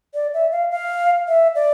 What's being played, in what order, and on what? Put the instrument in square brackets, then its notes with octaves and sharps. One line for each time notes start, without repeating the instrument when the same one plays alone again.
[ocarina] D5
E5
F5
F5
E5
D5